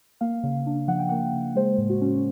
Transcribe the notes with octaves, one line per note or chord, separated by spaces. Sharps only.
A#3 F5
C#3
D4
F3 F#5
G5
A#3 F#5
C#3
G#3 C5
A2
F#4
C#4